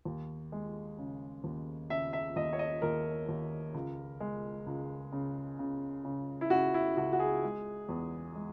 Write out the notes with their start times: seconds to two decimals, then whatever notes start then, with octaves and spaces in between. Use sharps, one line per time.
0.05 D#2
0.52 G#3
0.98 C#3
1.44 D#2
1.90 C#3 E5
2.13 E5
2.36 D#2 D#5
2.53 C#5
2.59 D#5
2.82 D#2 A#4
3.29 D#2
3.74 C#2
4.20 G#3
4.67 C#2
5.12 C#3
5.59 C#3
6.05 C#3
6.41 E4
6.50 C#3 F#4
6.74 E4
6.97 C#2 F#4
7.13 F#4
7.20 G#4
7.43 G#3
7.89 E2
8.35 G#3